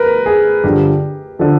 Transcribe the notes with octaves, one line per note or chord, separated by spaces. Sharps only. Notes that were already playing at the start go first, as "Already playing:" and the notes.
Already playing: A#4 B4
G#4
G2 D3 F3 G4
D3 F3 A4